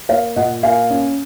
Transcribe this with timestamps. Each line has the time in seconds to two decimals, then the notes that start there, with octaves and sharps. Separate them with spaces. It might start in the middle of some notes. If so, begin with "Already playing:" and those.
0.09 A#3 C#5 F5
0.36 A#2 D#5 F#5
0.63 A#3 F5 G#5
0.90 C#4